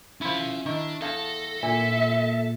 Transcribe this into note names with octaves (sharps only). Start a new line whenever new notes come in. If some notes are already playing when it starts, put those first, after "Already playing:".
F3 C#4 E4 B5
D#3 D4 E4
E2 A4 F5 A5 A#6
A#2 D3 E5 G#5